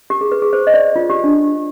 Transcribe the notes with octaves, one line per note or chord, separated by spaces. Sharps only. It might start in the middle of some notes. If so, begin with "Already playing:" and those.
G4
G#4
B4
G#4
C5
D#5
D5
F4
G4
D4